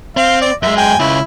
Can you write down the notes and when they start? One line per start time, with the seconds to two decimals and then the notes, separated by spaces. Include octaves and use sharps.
0.17 C4 F5
0.41 D5
0.63 F#2 G#3 E5
0.77 G5 G#5
1.00 C#2 C#3 E4